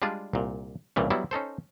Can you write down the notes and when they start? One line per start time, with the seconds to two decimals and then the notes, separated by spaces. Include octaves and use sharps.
0.02 G3 G#3 D4 F4 G#4
0.33 C2 A#2
0.96 C2 A#2 C#3 E3 G3
1.10 F#3 G3 B3 E4
1.31 C#4 D#4 A4 C5